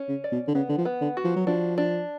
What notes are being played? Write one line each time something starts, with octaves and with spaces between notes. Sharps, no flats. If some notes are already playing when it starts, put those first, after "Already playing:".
Already playing: C#4
C#3
D5
B2
D3
C#3 B3
D3
F3
B3
D3
F#4
F3
F#3
F3 D4
D4